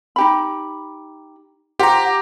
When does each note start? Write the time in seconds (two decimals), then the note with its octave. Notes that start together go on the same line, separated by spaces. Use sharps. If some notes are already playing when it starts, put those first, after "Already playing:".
0.16 D#4 G4 B5
1.79 F4 G4 C5 F#5 A#5